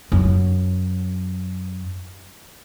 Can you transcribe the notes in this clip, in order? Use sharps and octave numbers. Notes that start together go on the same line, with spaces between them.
F#2 F#3